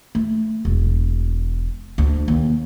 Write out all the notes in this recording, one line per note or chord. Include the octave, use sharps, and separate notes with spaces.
A3
E1
D2
D#2